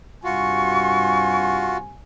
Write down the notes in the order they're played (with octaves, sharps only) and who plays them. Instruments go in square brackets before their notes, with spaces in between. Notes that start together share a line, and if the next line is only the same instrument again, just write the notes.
[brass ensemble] G2 C3 G#5 [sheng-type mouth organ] F4 F#4 [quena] C#6